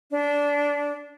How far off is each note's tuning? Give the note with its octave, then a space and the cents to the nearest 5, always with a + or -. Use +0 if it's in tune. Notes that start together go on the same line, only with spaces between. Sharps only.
D4 -20